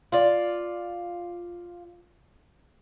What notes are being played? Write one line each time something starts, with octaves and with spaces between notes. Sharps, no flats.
F4 D5